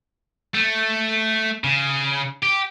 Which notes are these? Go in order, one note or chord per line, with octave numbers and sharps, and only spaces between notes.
A3
C#3
G4